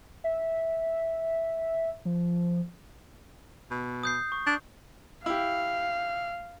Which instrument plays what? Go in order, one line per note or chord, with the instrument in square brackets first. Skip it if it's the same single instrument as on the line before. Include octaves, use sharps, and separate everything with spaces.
[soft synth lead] E5
F3
[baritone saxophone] B2
[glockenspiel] D#6 G6 C7
C#6
[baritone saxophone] D4
[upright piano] E4 G4 [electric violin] F5